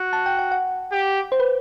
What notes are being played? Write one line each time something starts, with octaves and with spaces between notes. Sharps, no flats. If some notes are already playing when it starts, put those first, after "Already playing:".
Already playing: F#4
A5
G5
F#5
F#5
G4
C5
B4